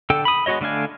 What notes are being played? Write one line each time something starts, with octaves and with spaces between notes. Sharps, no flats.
D3 A4 G5
B5 D#6
G#3 B3 F#4 C#5 D#5
D3 A3 D4 F5 G#5